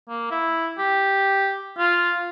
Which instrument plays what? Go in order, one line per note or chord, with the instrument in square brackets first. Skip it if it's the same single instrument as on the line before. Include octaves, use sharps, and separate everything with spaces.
[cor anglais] A#3
E4
G4
F4